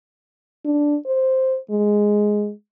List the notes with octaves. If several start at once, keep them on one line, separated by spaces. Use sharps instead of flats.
D4
C5
G#3